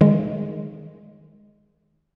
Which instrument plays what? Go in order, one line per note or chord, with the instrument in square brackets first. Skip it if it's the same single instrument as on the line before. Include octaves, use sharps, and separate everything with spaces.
[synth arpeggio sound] D#3 G#3